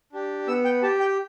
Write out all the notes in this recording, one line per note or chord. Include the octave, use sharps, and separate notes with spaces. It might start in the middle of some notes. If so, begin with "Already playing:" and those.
D4 G4
B3 E6
G5
G4 A5
G5